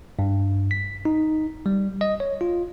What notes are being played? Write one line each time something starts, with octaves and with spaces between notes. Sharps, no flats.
G2
B6
D#4
G3
D#5
C#5
F4